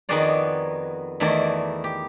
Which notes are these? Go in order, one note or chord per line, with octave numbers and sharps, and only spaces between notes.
F2 D#3 B3 F#4 G#4 D5
E2 D#3 A3 E4 F#4 D5
G4